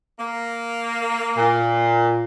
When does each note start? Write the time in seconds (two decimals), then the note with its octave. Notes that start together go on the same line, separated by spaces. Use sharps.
0.19 A#3
1.37 A#2